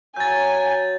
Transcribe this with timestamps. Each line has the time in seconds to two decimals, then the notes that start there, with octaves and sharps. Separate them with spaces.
0.16 F#3 G#5 G6 A6